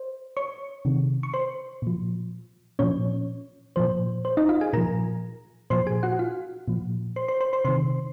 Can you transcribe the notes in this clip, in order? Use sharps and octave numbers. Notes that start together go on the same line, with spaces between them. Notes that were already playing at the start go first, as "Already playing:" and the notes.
Already playing: C5
C#5 C#6
C3 D#3
C#6
C5 C6
A#2 F3
A#2 F3 C#4 C#5
A#2 F3 C5
C5
D#4 D#5
F4 F5
G#4 G#5
A#2 F3 A#4 A#5
A#2 F3 C5 C6
G#4 G#5
F#4 F#5
F4 F5
A#2 F3
C5 C6
C5 C6
C5 C6
C5 C6
C3 D#3 C5 C6